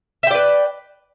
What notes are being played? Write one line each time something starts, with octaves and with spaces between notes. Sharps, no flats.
B4 D5 E5 G5